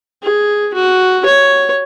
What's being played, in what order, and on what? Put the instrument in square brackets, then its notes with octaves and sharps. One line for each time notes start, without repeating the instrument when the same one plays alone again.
[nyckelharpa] G#4
F#4
C#5